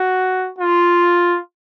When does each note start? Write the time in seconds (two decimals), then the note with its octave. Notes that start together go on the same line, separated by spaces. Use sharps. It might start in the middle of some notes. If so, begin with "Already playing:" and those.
Already playing: F#4
0.59 F4